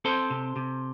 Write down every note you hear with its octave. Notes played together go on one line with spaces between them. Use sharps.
C4 A4 C5
C3
C3